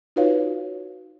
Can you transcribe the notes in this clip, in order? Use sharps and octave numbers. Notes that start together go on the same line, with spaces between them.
D#4 F4 F#4 B4 C#5 F5